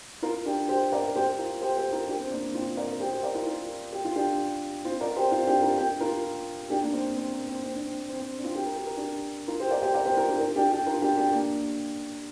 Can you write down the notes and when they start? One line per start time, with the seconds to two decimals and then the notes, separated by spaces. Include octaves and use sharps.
0.22 F4 A#4
0.46 D4 G4
0.69 G4 C5
0.92 A#4 D5
1.08 A#4
1.15 G4 C5
1.38 F4 A#4
1.62 G4 C5
1.77 G4 C5
1.92 F4 A#4
2.08 D4 G4
2.20 C4
2.31 A#3 D4
2.54 C4 F4
2.77 A#4 D5
2.92 A#4
3.00 G4 C5
3.12 G4 C5
3.23 A#4 D5
3.35 F4 A#4
3.47 F4 A#4
3.93 G4
4.05 F4
4.16 D4 G4
4.85 C4 F4
5.00 A#4 D5
5.16 G4 C5
5.32 C4 F4
5.47 D4 G4
5.62 F4 A#4
5.78 D4 G4
6.00 F4 A#4
6.70 D4 G4
6.82 A#3 D4
6.93 C4
7.16 C4
7.32 A#3
7.47 C4
7.63 C4
7.76 D4
7.86 C4
8.09 C4
8.20 C4
8.38 D4
8.44 C4 F4
8.55 G4
8.66 A#4
8.76 G4
8.87 A#4
8.97 D4 G4
9.48 F4 A#4
9.60 G4 C5
9.71 A#4 D5
9.82 G4 C5
9.94 A#4 D5
10.06 G4 C5
10.17 F4 A#4
10.29 D4 G4
10.40 F4 A#4
10.55 D4 G4
10.71 D4 G4
10.86 F4 A#4
11.02 D4 G4
11.17 D4 G4
11.33 A#3 D4